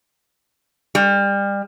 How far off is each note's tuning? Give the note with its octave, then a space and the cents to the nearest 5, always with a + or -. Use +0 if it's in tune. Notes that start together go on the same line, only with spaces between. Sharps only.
G3 +30